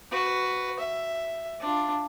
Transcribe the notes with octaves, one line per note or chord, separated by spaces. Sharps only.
F#4 B4
E5
D4 F4